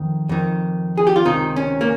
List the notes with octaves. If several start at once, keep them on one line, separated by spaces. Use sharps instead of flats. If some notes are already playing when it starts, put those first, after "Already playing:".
Already playing: F2 D#3
F2 D#3
G#4
G4
F4
C#2 C3 D#3 D#4
C#4
A#3